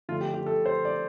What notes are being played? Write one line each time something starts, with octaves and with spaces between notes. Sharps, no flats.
D3 F3 A3 F4
G4
G4
A4
C5
D5